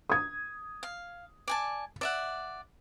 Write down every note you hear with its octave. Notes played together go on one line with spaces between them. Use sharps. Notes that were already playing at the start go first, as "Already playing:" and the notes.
D#6 G#6
F5
D5 G#5 A5
D5 E5 F#5